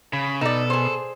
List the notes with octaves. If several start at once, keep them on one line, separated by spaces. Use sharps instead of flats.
C#3 B5
B2 D#4 A4 D5
G#4 C5